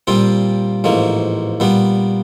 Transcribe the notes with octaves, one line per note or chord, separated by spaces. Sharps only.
A#2 G3 C4 F4
A1 G#2 F3 A#3
A#2 G3 B3